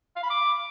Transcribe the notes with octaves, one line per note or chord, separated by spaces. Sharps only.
F5
B5
D6